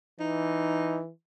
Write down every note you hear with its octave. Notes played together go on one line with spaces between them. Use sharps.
E3 D#4